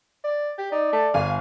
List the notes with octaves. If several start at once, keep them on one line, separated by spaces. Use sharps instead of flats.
D5
G4
D#4 D5
A3
G1 F5 G#5